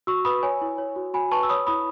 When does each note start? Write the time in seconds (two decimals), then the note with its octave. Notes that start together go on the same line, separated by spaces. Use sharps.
0.07 F#4 C#6 E6
0.25 B4 B5 D#6
0.43 C#5 G#5
0.62 E4
0.78 C#5
0.96 F#4
1.14 F#4 G#5 B5
1.32 B4 A5 C#6
1.43 E6
1.49 C#5 B5 D#6
1.67 E4 B5 D#6